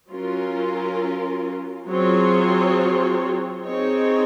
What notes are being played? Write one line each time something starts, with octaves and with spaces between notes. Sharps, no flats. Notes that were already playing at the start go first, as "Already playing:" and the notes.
F#3 C#4 F4 A#4
F#3 C4 F4 G#4 C#5
C4 D#4 G#4 C#5